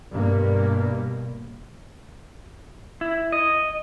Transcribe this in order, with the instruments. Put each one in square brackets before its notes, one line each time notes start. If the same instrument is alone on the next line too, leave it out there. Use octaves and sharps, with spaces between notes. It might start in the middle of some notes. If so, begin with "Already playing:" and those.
[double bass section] G2 B2 A#3
[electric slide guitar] E4
D#5